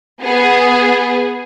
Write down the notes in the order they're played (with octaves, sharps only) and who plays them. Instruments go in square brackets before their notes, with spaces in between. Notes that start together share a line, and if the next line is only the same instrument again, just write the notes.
[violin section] B3 G#4